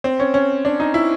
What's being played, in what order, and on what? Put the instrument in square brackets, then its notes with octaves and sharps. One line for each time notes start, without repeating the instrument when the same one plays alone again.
[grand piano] C4
C#4
C#4
D4
D#4
E4